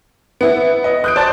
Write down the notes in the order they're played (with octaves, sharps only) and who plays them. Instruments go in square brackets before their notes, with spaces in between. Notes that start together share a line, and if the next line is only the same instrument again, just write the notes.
[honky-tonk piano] B3 E4
[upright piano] D#5
[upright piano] D#6 [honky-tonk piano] F#6 G6 D7
[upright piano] C5 A5 A6 [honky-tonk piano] D5